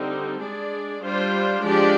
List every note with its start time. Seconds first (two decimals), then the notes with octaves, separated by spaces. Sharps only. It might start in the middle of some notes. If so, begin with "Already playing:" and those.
Already playing: D3 G3 C4 D#4
0.41 G#3 D4 G#4 D5
1.02 G3 D4 F4 C5
1.64 F3 G#3 D4 G4 D5